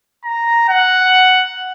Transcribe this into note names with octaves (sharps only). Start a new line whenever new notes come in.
A#5
F#5